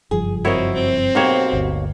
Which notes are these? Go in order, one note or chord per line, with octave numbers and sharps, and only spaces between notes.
F#1 G2 F3 G#4
C4 E4 F#4 A#4 C#5 D#5
C4
B1 A#3 F#4 G4 C5 C#5
G1 D2